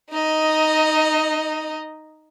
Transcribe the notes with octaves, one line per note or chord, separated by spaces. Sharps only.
D#4 D#5